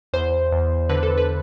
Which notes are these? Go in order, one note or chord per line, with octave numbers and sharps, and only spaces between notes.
E2 C5
E2
D3 B4
A4
B4